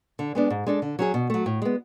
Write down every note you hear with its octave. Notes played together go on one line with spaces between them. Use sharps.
D3
G#3 B3 D4
G#2
G#3 D4 A4
D3
F#3 C#4 G#4
B2
F#3 A3
A2
G#3 B3